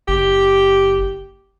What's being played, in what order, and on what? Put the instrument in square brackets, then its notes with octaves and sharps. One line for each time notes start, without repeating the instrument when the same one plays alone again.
[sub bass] F#1 [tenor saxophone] G4